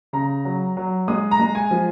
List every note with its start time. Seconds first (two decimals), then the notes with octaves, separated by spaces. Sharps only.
0.13 C#3 A#5
0.45 F#3
0.77 F#3
1.08 G#3 D#6
1.31 A#5
1.40 G#3
1.55 G#5
1.71 F3